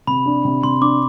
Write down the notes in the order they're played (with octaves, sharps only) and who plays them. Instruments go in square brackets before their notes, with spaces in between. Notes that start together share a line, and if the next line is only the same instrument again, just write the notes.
[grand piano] C3 [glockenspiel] B5
[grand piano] D4
C3
[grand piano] C3 [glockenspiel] C6
[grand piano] D4 [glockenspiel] D6